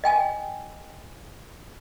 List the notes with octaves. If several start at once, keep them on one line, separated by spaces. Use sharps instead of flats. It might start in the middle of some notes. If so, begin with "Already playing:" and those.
D#5 G5 G#5